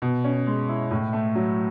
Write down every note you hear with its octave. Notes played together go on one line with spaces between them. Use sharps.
B2
C#4
G#3
E4
A2
A3
F#3